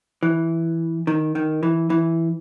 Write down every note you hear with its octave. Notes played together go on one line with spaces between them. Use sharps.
E3
D#3
D#3
E3
E3